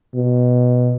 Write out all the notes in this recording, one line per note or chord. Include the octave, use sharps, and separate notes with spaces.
B2